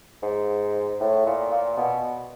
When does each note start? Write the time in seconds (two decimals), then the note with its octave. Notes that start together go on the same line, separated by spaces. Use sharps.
0.23 G#2
1.01 A2
1.26 A#2
1.52 A#2
1.77 B2